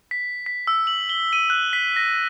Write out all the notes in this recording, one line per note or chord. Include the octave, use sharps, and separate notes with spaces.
B6
B6
E6
F#7
G7
D#7
F#6
B6
A#6